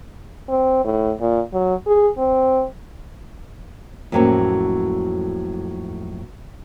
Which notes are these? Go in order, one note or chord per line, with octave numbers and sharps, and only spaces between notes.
C4
A2
A#2
F#3
G#4
C4
F2 A2 F#3 A#3 C#4